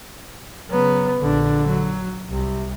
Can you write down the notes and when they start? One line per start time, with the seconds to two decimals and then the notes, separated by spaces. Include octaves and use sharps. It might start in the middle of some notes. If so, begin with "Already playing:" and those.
0.70 C#3 F#3 B3
1.20 A#1 D3 D4
1.68 F#3
2.30 C2 C3